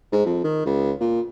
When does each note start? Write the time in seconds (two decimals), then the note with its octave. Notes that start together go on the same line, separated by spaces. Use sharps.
0.12 G#2
0.26 F2
0.43 D#3
0.65 C#2
1.00 A#2